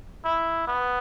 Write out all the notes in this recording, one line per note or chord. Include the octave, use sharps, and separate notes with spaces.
E4
B3